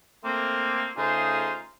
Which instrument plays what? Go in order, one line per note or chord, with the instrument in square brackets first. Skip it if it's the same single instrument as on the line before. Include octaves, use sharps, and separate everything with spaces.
[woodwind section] A3 A#3 C4
C#3 A3 D#4 F4 G#4 C5